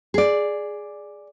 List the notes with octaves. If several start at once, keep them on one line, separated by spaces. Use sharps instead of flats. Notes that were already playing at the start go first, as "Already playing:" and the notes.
G#4 D5